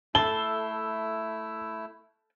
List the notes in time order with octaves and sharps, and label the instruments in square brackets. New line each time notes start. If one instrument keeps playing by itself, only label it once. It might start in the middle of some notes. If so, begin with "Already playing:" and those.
[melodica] A3 E4 E6 [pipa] A4 [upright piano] G7